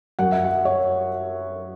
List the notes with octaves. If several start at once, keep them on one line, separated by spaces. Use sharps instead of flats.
F#2 F#3 F#5
E5
F#5
C#5